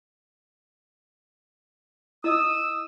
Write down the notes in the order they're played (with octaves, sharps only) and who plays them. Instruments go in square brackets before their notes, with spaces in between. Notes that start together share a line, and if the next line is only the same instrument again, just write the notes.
[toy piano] E4 D#5 [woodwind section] D#6 E6